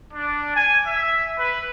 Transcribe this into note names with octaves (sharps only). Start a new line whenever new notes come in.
D4
G#5
E5
B4